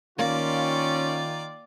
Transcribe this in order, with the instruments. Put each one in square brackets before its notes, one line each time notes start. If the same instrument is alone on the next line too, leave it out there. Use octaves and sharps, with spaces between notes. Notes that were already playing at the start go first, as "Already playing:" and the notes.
[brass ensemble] D#3 F4 [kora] A#3 [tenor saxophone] C#4 [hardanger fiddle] D5